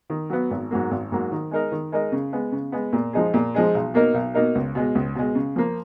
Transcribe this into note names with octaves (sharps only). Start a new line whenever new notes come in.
D#3
F#3 B3
G#1
G#2 F#3 A#3
G#1
G#2 F#3 A#3
D#3
G#3 D#4 A#4 D#5
D#3
G#3 D#4 A#4 D#5
C#3
G#3 B3
C#3
G#3 B3
A#2
F3 G#3 D#4 G#4
A#2
F3 G#3 D#4 G#4
B1
B2 A#3 D#4 A#4
B1
B2 A#3 D#4 A#4
C#2
B2 G#3
C#2
B2 G#3
C#3
F3 A#3